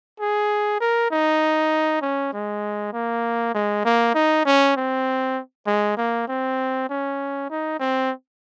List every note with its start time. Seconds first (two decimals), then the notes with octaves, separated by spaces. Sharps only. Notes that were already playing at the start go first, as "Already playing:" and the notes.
0.20 G#4
0.80 A#4
1.11 D#4
2.02 C#4
2.33 G#3
2.93 A#3
3.55 G#3
3.85 A#3
4.14 D#4
4.45 C#4
4.76 C4
5.66 G#3
5.97 A#3
6.28 C4
6.89 C#4
7.50 D#4
7.79 C4